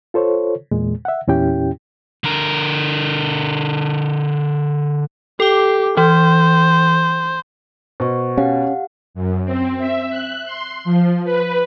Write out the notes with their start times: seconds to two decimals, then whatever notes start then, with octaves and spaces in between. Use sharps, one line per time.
0.14 F4 A4 C5 C#5
0.71 E2 A#2 G#3
1.05 E5 F#5
1.28 E2 A#2 C#4 E4 G4 G5
2.24 D3 A#4
5.40 G4 A4 D6
5.97 E3 C5
8.00 B2 C5 F#5 C#6
8.38 C#4 G4 F5 F#5
9.14 F#2
9.45 C4
9.78 E5
10.10 F#6
10.45 C6
10.84 F3
11.24 B4